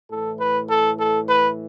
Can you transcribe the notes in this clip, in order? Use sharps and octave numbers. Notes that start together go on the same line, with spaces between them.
A2 E3 A4
B4
A4
A4
B4